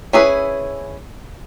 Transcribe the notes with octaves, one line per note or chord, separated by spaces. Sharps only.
C#4 E4 G#4 B4